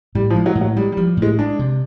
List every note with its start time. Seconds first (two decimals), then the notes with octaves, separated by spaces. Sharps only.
0.15 A2 G3
0.30 F3
0.36 G#3
0.46 F#3
0.55 A2
0.61 F#3
0.76 G3 G#3
0.92 G3
0.97 F3
1.17 A2
1.22 G#3
1.39 G#3 D4
1.59 C3